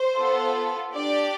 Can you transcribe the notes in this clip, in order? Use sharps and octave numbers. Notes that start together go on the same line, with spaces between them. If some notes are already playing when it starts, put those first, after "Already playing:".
Already playing: C5
B3 F4 A4
D4 G4 D5